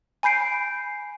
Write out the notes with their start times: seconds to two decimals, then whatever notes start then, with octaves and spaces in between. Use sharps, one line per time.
0.23 G#5 B5 G6 C7 D7